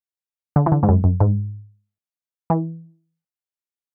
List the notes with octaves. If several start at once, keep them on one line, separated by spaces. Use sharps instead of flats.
D3
E3
D3
G#2
F#2
F#2
G#2
E3